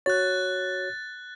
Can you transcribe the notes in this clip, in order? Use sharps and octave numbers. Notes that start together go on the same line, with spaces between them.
F#4 C#5 F#6 A6